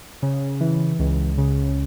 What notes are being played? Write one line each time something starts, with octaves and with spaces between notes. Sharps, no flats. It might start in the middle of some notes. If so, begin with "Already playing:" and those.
C#3
E3
C#2
C#3